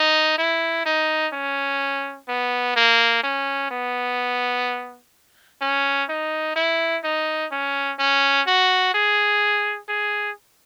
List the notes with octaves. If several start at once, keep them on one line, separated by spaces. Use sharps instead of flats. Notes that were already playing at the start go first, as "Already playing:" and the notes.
Already playing: D#4
E4
D#4
C#4
B3
A#3
C#4
B3
C#4
D#4
E4
D#4
C#4
C#4
F#4
G#4
G#4